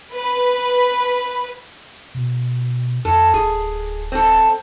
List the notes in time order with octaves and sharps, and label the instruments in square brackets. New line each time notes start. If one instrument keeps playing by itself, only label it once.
[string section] B4
[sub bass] B2
[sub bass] F2 [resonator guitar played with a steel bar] A4
[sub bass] D1 [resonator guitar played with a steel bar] G#4
[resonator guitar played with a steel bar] C4 A4